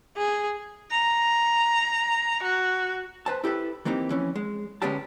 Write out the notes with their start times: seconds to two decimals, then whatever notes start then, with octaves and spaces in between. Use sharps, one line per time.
0.17 G#4
0.91 A#5
2.43 F#4
3.26 B4 C5 A5
3.44 E4 G4 A4 B4
3.85 E3 A#3 C4 D#4 G4
4.09 F2 E3 C#4
4.36 G#3
4.82 D2 G#3 B3 C#4 G4 A5